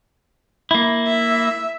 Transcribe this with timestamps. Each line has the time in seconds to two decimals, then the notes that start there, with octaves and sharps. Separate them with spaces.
0.71 A#3 E4
1.08 E5